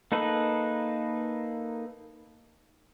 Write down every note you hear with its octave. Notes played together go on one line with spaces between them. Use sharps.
A#3 D#4 A4 B4